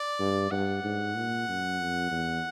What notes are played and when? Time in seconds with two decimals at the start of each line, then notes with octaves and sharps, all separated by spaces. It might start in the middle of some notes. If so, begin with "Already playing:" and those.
Already playing: D5
0.20 G2
0.51 G2 F#5
0.84 G#2
1.15 A#2
1.48 F#2
1.80 F2
2.11 E2